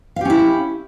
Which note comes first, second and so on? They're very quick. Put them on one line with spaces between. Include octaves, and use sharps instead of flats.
F5 G4 C#4 E4